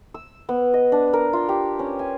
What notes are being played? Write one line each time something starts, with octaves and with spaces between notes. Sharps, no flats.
E6
B3
D#5
D4
A#4
F4
G4
C#4
G#5